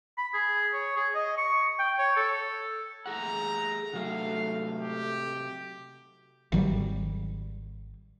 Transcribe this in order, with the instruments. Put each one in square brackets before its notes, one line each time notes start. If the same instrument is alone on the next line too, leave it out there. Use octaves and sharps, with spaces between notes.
[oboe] B5
G#4
C#5
G#4
D#5
C#6
G5
C#5
A4
[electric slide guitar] A3 G#4 F#5 [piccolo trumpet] A#5
[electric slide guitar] C3 F#3 F#4 [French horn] A3 [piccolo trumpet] F5
[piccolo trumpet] G4
[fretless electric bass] G#1 D#3 F#3 G3